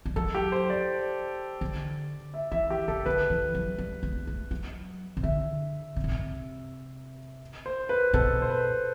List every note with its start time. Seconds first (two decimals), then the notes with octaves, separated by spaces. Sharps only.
0.06 G3
0.16 F#3 A4
0.35 G4
0.52 C5
0.70 D5
1.61 D3
2.34 E5
2.52 E3 E5
2.70 G4
2.88 C3 A4
3.06 D3 B4
3.30 E3
3.54 F#3
3.78 G3
4.03 B3
4.27 A3
4.51 F#3
5.17 C3
5.23 D3 E5
5.96 C3
6.04 B2
6.12 C3
7.66 C5
7.89 B4
8.13 B2 A4
8.42 C5
8.49 B4